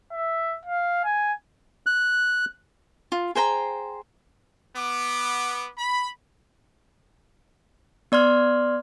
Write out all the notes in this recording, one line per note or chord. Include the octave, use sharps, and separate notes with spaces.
E5
F5
G#5
F#6
F4
G#4 C5 G5 A#5
B3 D6
B5
B3 D5 C6 F6